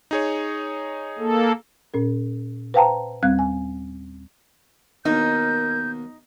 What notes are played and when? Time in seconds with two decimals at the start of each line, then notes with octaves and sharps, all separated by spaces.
0.11 D#4 G#4 C#5
1.19 A#3 A4
1.94 A#2 C#4 A#4
2.74 B4 C5 F5 G5 A5 A#5
3.23 D#2 G3 C4 F5 F#6 G#6
3.39 G#5
5.05 D#2 B2 D#4 A#4 G6